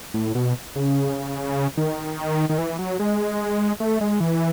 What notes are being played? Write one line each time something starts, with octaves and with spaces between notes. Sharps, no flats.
A2
B2
C#3
D#3
D#3
E3
F#3
G#3
A3
G#3
E3